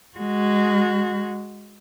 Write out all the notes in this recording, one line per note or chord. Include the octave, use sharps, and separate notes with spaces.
G#3 F#4